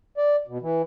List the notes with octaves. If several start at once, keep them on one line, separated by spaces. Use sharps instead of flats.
D5
B2
E3